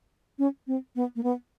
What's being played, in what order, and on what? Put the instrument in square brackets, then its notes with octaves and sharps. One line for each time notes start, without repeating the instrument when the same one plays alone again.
[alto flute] C#4
C4
B3
A#3
B3